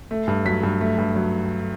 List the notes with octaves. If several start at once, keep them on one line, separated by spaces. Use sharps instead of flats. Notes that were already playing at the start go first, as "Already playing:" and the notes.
A3
G2
F#3 B6
G2
A3
G2
F#3